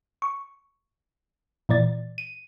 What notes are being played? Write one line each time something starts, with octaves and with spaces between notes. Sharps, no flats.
C#6
A#2 E3 D5 A6
D#7